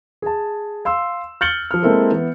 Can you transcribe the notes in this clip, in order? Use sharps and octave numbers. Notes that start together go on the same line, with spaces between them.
G#4 A5
F5 C6 E6
F6 G6 A6 C#7 F#7 G7
F3 F6
G#3 A#3 C4 E4 A4 A#4
E3 B3